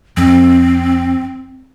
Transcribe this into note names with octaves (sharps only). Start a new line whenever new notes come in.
F2 C4